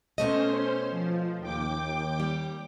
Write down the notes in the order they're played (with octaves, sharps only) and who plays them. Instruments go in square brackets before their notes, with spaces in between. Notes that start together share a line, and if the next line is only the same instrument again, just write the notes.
[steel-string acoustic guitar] B2 A3 D#5 [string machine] C#4 C5 C6
[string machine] F3
D#2 G5 D6
[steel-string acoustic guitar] G3